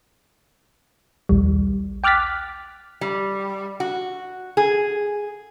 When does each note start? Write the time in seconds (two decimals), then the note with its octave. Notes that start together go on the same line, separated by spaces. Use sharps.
1.29 A#1 D#2 G3
2.04 G5 D6 F6 F#6 A6 B6
3.01 G3
3.80 F#4
4.57 G#4